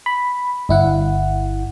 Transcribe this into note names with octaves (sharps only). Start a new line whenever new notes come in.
B5
G1 E4 F#5